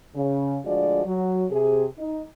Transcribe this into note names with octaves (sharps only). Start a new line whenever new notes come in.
C#3
D2 F3 G#3 D4 F#4 D5
F#3
C3 G#4
D#4